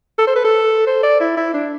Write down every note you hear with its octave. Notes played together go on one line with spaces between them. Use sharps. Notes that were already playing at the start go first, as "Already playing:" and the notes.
A4
C5
B4
A4
C5
D5
E4
E4
D4